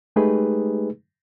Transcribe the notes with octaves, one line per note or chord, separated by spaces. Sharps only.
G#3 A3 D#4 G4 G#4 B4